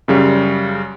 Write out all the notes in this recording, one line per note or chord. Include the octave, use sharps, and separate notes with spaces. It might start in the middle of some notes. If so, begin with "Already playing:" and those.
F#2 C#3 G3